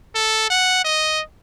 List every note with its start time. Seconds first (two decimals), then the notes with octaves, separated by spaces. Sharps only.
0.15 A4
0.50 F#5
0.85 D#5